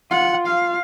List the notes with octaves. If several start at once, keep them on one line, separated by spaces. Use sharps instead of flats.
F4 F#5
F5